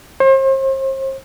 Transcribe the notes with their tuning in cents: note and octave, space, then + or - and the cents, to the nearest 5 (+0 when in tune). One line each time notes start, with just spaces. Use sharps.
C5 +40